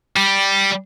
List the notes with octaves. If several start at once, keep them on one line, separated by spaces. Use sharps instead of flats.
G3